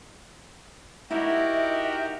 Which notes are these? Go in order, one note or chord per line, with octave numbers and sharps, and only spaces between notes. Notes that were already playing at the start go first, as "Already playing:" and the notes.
D#4 E4 F#4 G4 A#4 E5